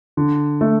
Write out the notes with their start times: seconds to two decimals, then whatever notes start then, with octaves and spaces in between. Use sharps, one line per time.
0.17 D3
0.61 A3